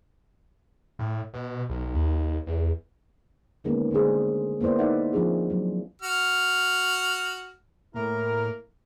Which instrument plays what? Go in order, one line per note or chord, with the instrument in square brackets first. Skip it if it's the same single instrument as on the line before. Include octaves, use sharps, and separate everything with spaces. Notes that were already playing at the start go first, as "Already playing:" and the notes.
[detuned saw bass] A2
B2
B1
D#2
E2
[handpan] D3 D#3 G#3 A#3 B3 C#4
D3 G#3 A3 D4 G#4 C5
A#3 B3 E4 C5 D5
D#4 D5 E5 F#5
F3 C4 D4 F4 G#4
F#3
[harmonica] F#4 F6
[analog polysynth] A2 [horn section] A#3 E4 A#4